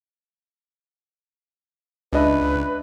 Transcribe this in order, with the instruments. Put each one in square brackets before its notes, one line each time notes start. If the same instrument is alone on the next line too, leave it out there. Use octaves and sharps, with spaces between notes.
[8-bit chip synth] C#2 [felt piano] D4 D#5 E5 [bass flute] B4